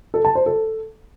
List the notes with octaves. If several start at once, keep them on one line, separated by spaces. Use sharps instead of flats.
A4
A5
C5
A4